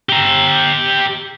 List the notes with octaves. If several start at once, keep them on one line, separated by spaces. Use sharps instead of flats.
G4 A#5